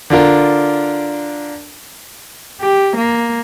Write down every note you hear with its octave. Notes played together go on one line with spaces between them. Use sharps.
D3 D4 F4 A#4
G4
A#3